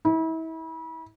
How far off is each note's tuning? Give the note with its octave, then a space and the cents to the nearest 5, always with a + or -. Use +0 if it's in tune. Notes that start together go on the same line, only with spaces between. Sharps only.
E4 -35